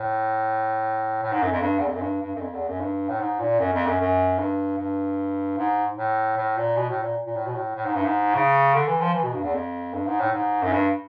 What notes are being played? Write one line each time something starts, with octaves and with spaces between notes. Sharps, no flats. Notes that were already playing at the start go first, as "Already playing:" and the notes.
Already playing: A2
A2
G#2
F#2
F2
G2
E2
F2
F#2
G2
G2
F#2
F2
E2
F#2
G2
A2
G#2
A#2
F#2
F2
F#2
F#2
G2
G2
G#2
A2
A2
A#2
B2
A2
A#2
A#2
A2
B2
A2
A2
G#2
G2
G#2
C#3
D3
E3
F3
E3
B2
G2
E2
F2
G2
G#2
A2
G#2
F#2
G2